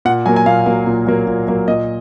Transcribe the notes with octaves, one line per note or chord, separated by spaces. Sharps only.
A#2 F#5
F#3 A#3 G#5
G#5
A#2 F5
F#3 A#3
A#2
F#3 A#3
A#2
F#3 A#3
A#2 D#5